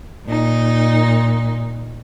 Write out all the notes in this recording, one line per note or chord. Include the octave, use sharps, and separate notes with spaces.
A#2 D#4